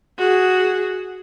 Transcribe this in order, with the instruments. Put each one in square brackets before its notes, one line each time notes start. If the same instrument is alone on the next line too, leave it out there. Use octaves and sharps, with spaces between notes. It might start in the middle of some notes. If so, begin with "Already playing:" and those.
[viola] F#4 G#4